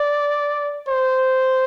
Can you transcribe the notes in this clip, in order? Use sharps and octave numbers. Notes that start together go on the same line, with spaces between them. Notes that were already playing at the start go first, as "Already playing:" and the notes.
Already playing: D5
C5